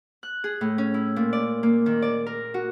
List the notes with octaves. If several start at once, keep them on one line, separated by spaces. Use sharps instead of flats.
F#6
G#4
A2
C#4
E4
A#2
D5
A#3
D#3
D5
A#4
F#4